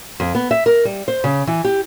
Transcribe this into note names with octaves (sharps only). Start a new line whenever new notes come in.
F2
B3
E5
A#4
G3
C5
C#3
E3
G4